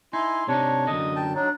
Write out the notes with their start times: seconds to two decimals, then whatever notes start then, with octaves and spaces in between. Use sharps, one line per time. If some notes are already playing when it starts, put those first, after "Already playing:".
0.13 D#4 E4 G#5 C6
0.48 C3 D4 D#4 C#5
0.87 F#2 D3 D#5
1.16 G5 A5
1.34 F#3 D4 D#4